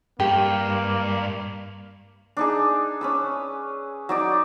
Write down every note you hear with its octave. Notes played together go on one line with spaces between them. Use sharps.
G2 A#3 G4
D4 D#4 G#4
C#4 B4 E6
F#3 D#4 D5